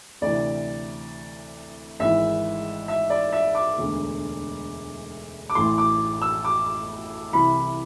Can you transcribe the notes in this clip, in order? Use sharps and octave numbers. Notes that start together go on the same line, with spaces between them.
D2 C3 E3 D5
G#1 G#2 E3 E5
E5
D5
E5
D6
E1 D2 D3
D6
A1 A2 E3 C6
D6
E6
D6
C2 C3 E3 B5